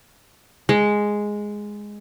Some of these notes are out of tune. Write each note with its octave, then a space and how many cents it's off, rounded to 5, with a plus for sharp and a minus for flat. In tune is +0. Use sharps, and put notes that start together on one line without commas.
G#3 +0